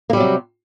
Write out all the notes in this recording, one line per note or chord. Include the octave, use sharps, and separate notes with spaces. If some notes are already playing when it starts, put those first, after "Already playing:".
C3 F#3 G3 A#3